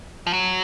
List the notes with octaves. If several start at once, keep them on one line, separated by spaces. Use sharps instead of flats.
F3
F#3